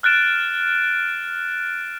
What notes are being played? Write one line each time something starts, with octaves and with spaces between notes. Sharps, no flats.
F6 F#6 A6 D7 E7